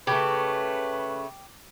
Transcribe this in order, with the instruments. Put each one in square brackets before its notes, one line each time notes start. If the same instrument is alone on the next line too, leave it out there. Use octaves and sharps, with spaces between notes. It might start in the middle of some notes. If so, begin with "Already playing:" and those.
[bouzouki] C#3 A3 [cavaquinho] G4 [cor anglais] B4